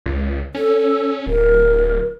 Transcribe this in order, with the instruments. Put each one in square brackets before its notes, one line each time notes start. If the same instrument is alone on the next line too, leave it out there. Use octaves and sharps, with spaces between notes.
[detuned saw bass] C#2
[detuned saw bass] C#4 [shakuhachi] A4
[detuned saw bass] D1 [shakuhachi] A#4